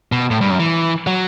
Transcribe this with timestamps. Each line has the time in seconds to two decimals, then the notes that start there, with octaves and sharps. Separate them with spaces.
0.12 B2
0.31 A2
0.41 G2
0.50 F#2
0.59 E3
1.07 F#3